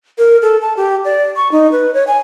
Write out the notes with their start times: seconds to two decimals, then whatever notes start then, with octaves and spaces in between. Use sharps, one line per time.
0.18 A#4
0.42 A4
0.61 A5
0.77 G4
1.05 D5
1.36 C#6
1.52 D#4
1.72 B4
1.94 C#5
2.07 G#5